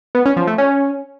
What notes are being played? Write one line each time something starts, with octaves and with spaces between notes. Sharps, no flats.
B3
C#4
F3
A3
C#4